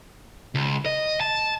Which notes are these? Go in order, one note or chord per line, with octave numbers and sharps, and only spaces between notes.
C#2
D#5
A5